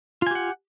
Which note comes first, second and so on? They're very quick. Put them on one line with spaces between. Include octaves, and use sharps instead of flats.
F4 G#5 G4 F#5